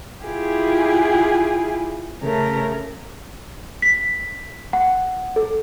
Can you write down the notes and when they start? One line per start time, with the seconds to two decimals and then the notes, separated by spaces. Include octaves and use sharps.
0.24 E4 F4 G4 G#4
2.22 C#3 A3 A#4
3.82 B6
4.73 F#5
5.36 A4